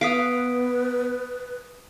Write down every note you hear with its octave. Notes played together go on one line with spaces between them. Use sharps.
B3 B4 F5 D#6 B6 D7